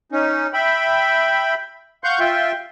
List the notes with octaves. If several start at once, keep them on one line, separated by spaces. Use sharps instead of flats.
C#4 D#4
E5 G5 B5
F5 F#5 C6 C#6 G6
F4 E5 G5 C6